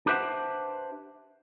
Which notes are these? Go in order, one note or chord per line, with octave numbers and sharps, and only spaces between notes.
D4 G4 B4 C5 E5 F#5